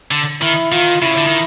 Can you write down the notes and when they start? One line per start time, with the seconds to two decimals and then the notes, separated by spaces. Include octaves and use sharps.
0.11 D3
0.41 D#3 E4
0.71 D#3 F4
1.02 C#3 E4
1.17 D3
1.27 D#3